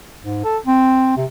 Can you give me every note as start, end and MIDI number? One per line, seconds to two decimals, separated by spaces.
0.24 0.42 44
0.44 0.57 69
0.66 1.12 60
1.17 1.25 48